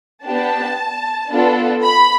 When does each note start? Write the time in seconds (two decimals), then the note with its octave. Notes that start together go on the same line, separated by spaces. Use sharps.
0.25 B3 D4 G4 A5
1.32 B3 D4 F4 A4
1.84 B5